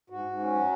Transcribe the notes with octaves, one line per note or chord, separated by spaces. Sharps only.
G#2 F#4
G#2
C#4
F#3